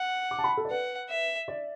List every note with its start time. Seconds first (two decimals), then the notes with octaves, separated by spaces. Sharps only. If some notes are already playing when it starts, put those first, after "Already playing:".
Already playing: F#5
0.31 D6
0.39 A5
0.44 B5
0.57 A4
0.65 D5
0.70 B4 F#5
1.10 E5
1.48 D5